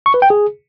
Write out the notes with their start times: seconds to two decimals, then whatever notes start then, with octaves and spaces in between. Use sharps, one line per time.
0.06 C#6
0.14 B4
0.22 G5
0.30 G#4